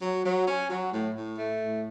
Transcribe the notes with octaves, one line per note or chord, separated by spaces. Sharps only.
F#3
F#3
C#4
F#3
A2
A2
A3
A2